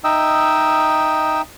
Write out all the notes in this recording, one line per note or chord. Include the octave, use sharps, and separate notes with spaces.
D#4 D#5 E5 G5 E6